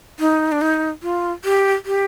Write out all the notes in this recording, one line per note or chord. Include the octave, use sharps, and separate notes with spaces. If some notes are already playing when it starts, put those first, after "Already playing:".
D#4
D4
D#4
F4
G4
G4